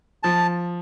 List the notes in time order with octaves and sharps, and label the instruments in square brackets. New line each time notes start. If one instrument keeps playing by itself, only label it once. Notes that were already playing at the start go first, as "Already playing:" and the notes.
[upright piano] F3 [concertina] A5